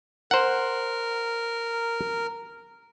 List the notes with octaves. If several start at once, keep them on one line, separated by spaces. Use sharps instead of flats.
A#4 C5 F#5